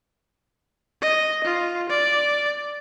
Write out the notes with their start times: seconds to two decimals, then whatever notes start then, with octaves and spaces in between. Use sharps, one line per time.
1.01 D#5
1.44 F4
1.89 D5